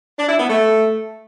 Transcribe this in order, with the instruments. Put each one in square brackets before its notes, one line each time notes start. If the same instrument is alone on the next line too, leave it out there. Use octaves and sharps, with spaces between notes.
[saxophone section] D4
E4
B3
A3